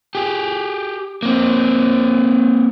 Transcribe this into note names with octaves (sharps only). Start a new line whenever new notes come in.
G4 G#4
A#3 C4